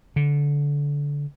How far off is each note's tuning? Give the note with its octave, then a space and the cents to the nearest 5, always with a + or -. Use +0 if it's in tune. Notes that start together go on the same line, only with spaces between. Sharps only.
D3 -20